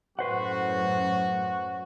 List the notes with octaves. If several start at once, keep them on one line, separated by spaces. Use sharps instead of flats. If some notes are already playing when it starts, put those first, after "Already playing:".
F#2 A2 F#4 B4 C5 F#5